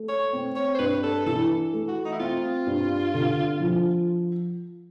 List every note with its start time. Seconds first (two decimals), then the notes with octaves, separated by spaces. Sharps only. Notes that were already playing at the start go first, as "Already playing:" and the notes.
Already playing: A3
0.09 C#5
0.33 C4
0.56 C#5
0.75 C5
0.79 G2 B4
1.03 A4
1.26 E3 A4
1.73 A3
1.88 F#4
2.05 D#4
2.13 E4
2.20 C4 F4
2.67 G2
3.14 D3
3.60 F3